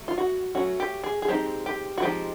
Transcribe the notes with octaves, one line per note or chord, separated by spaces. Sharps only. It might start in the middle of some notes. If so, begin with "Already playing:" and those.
Already playing: F#3 A3
F4
F#4
F#3 A3 C#4 F#4
G4
G#4
G#4
F3 G#3 C4 D#4 G4
G4
F#4
F3 G#3 C4 D#4 G4